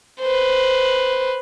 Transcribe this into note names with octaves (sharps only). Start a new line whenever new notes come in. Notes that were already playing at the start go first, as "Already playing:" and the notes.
B4 C5